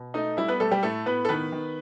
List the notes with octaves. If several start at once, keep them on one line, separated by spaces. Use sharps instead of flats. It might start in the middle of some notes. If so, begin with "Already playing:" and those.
Already playing: B2
A3 D#4 D#5
G3 E4 E5
B3 B4
G3 A3 A4
G3 G4
A2 A3 A4
A2 B3 B4
A4
D#3 B3 B4
D#3